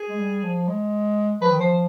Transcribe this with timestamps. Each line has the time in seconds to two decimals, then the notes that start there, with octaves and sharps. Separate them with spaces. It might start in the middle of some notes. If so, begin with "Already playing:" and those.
Already playing: G#4
0.09 G#3
0.18 G3
0.43 F3
0.68 G#3
1.41 F3 B4
1.50 D#3
1.59 F3 C5